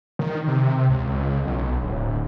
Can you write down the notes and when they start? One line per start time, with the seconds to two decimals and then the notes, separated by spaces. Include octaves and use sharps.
0.19 D#3
0.48 C3
0.89 C#2
1.45 B1
1.83 D1